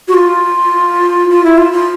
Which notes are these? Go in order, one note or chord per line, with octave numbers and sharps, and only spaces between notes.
F#4
F4
F4
E4
F4
F4